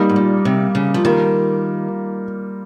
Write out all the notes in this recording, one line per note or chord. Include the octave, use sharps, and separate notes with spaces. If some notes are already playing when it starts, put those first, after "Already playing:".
Already playing: G3 A#3 D#4
G#2
A#2
C3
C#3
F3
D#3 G3 A#3 F4 A#4